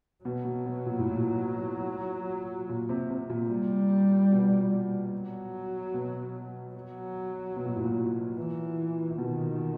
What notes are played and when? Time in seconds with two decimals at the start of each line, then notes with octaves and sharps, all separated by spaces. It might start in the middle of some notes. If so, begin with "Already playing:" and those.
0.25 B2 F#3
0.45 B2
0.66 B2
0.86 A#2
0.99 A2
1.11 A#2
2.69 A#2
2.89 C3
3.10 C3
3.30 A#2
3.50 G3
4.32 B2
5.12 F#3
5.94 B2
6.75 F#3
7.56 B2
7.65 A#2
7.76 A2
7.85 A#2
8.38 E3
9.18 B2 D#3